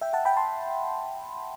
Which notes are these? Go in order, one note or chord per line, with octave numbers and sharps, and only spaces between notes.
E5 G5
F#5 A5
G5 B5
A5 C6